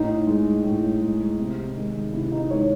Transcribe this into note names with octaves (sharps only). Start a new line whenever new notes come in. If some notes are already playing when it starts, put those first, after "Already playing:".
Already playing: A2 D#4
G#3
A2
G#3
C3
D#3 G#3
C3 E4
D#4
D#3 G#3 C#5